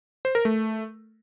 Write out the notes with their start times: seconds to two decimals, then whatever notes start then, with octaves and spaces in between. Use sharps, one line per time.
0.25 C5
0.35 A#4
0.45 A3